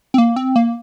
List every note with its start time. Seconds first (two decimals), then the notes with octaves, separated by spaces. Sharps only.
0.14 C4
0.18 A#3
0.36 C4
0.56 A#3